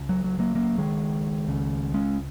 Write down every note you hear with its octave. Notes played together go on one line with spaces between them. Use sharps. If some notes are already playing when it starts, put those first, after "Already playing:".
Already playing: C#2
F#3
F#3
F#3 A#3
F#3 A#3
D#3 G#3
C#2 C#3
G#3 C#4